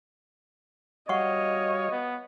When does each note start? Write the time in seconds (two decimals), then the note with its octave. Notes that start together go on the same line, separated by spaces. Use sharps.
1.09 G3 F#4 C#5 D#5 F5 F#5 C#6
1.91 B3